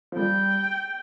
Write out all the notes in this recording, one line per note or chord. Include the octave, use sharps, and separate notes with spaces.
F3
G3 G5